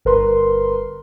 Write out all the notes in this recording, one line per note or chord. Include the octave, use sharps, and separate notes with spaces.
G1 A#4 B4 C6